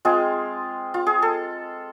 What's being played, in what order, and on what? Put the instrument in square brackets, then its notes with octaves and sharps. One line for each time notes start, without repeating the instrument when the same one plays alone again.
[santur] G#3 C4 F4 G#4
F4
G#4
A4